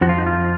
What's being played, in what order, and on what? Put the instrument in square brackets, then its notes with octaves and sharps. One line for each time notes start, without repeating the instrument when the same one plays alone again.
[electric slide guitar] F2 F3 F#4
F4
D#4
F4